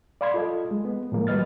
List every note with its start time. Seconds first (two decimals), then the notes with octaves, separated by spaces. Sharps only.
0.21 D5 F5 B5 C6 G#6
0.34 F4 A4 D#5
0.71 G#3
0.85 B3
1.12 A2 D#3 F3 G#3 A#3
1.27 F#3 G3 B4 D#5 F6 A6